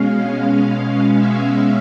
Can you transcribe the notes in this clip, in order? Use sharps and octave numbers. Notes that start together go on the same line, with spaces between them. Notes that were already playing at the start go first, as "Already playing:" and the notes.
Already playing: B2 G#3 C#4 F5
F5
E5